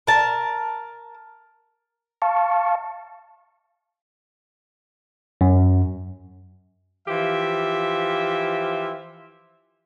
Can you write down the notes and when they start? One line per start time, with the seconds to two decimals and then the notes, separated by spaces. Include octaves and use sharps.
0.07 A#4 A5
2.22 F5 A5 C#6
5.41 F#2
7.08 E3 F3 F4 G4 E5